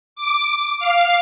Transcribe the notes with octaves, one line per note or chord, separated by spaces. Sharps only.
D6
F5